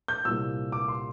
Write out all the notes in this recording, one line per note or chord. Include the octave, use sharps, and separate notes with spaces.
G6
C2 A#2 G3 E6
D6
C6